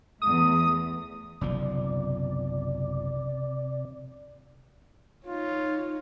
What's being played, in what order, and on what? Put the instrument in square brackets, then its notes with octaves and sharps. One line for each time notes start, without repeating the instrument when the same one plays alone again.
[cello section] E2 A3 [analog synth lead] D#6
[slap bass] F#1 B1 F3 [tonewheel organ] C3 D5
[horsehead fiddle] D#4 C#5 [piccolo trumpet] F4